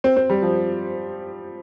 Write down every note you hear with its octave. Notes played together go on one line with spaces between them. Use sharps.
C4
C4
G3
F3